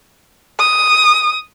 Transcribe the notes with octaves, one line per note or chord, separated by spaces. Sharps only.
D#6